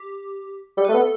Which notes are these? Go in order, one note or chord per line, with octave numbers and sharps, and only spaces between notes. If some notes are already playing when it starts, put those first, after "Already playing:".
Already playing: G4
G3 A4
B4
A3
B3 A4